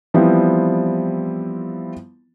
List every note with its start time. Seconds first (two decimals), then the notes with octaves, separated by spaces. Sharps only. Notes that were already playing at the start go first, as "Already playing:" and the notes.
0.14 E3 F3 G3 B3 C4 E4